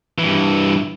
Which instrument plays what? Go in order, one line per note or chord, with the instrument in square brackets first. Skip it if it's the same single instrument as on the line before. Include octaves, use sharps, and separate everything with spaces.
[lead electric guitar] G2 E3